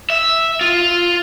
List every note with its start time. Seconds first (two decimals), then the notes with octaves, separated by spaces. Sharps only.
0.10 E5
0.61 F4